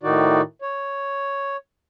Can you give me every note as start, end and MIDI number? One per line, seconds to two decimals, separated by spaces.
0.03 0.41 45
0.03 0.41 51
0.03 0.41 63
0.03 0.41 66
0.03 0.41 74
0.62 1.57 73